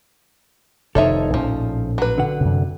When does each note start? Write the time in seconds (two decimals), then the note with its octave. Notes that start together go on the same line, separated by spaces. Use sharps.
0.95 F1 C3 D#3 F3 D#4 A4 C#5 E5
1.34 A#1 A2 F3 C#4
1.98 F#3 B4
2.18 D3 F#5
2.41 F#2 C3